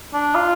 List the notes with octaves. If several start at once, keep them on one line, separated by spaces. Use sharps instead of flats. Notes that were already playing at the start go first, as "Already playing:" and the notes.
D4
F4